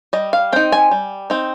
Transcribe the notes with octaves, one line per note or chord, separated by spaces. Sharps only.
G3 D#5
F5
C4 D#4 G5
G#5
G3
C4 D#4